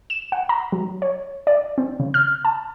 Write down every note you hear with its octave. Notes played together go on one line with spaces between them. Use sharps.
E7
F#5
A#5
F#3
C#5
D5
C4
C#3
F6
A5